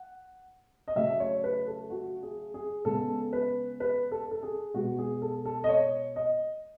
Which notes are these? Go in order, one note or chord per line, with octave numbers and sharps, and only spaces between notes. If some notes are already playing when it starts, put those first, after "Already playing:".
Already playing: F#5
D#5
C#3 F#3 A3 E5
C#5
B4
A4
F#4
G#4
G#4
C#3 G#3 B3 A4
B4
B4
A4
A4
G#4
B2 G#3 B3 F#4
G#4
A4
A4
D#5
C#5
D#5